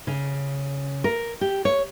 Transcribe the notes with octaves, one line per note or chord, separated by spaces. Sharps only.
C#3
A#4
G4
C#5